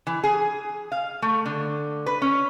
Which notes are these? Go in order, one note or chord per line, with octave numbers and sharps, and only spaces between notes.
E3
G#4
F5
A3
D3
B4
C#4